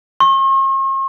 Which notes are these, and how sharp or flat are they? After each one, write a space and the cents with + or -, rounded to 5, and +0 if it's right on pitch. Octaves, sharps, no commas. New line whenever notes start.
C#6 -45